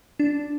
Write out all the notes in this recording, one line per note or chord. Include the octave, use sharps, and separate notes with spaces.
D4